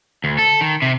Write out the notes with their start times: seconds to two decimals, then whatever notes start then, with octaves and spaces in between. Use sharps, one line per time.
0.24 D2
0.38 A4
0.61 D#3
0.82 C3